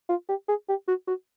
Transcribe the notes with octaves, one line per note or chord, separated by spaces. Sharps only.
F4
G4
G#4
G4
F#4
F#4